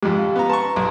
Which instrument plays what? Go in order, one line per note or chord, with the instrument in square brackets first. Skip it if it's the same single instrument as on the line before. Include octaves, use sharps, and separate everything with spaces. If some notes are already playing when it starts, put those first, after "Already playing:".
[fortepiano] F2 G#2 [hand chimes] G4
[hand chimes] F5
[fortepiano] B3 A#5
[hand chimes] B4 A#5 C6 [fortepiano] A5 C#6
[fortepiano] B1